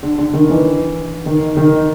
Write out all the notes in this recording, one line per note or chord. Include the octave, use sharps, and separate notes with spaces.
D3
D3
D#3
E3
D#3
D#3